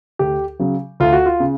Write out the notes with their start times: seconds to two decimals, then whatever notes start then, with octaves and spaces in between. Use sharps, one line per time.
0.19 D2 G4
0.59 C#3 F#3
1.00 D2 F4
1.13 F#4
1.26 F4
1.40 C#3